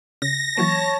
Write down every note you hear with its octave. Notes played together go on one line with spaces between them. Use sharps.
C#3 A#6
E3 F#3 A#3 C#5 A5